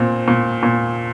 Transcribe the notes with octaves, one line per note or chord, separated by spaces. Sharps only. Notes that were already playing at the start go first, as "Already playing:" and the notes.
Already playing: A#2 C4
A#2
A#2